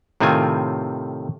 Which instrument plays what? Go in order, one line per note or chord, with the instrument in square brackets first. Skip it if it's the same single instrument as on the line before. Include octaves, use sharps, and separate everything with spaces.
[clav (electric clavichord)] A2 C3 D#3 C4 F4 G#5